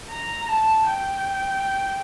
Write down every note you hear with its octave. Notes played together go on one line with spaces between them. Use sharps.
A#5
A5
G5